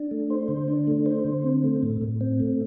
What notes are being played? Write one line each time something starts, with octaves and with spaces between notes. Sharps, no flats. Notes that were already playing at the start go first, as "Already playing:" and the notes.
Already playing: D4
A3
C5
D3
D4
A3
C5
D3
C4
A3
A2
A2
C4
A3